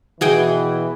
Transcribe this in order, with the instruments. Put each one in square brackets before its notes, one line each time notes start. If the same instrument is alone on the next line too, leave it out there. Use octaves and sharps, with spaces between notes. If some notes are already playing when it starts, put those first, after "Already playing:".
[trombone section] B2 E3 [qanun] F#4 G#4 G5